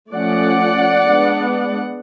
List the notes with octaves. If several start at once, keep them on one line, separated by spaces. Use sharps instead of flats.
F3 A3 C#4 D5 F#5
G#3 B3 D4